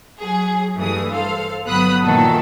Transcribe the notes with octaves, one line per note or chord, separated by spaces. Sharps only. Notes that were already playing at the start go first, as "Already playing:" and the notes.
F#3 G#4
G2 E3 A3 G#4 D#6
A4 C5 F5
G1 F#3 B3 B5 D#6 F#6
A#2 D#3 E3 F#3 F#4 A4